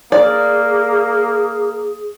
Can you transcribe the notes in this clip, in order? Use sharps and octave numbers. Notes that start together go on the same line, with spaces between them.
A#3 G#4 D5